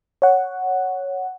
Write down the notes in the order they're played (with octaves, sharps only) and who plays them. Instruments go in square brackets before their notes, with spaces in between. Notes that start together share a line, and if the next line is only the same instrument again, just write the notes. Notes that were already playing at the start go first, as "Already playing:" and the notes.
[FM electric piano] C#5 F#5